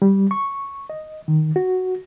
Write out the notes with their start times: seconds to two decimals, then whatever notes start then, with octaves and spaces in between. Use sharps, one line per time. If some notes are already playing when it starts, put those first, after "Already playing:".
0.02 G3
0.31 C#6
0.90 D#5
1.28 D#3
1.56 F#4